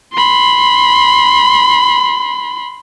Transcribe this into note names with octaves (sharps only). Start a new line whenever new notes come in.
B5 C6